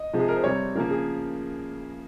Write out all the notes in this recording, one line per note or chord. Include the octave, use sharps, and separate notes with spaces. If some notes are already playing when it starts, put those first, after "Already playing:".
Already playing: D#5
C3 F3 G#3
G#4
A#4
C5
C3 G3 C4 C#5
C#3 F3 A#3 A#4
G#4